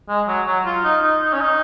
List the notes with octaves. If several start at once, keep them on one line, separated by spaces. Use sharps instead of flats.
G#3
F#3
F#3
F4
D#4
D#4
D#4
C#4
D#4